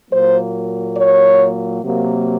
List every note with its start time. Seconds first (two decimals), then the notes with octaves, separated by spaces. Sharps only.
0.11 A#2 F#3 A#3 C5
0.97 C#5
1.82 C3 F#3 A#3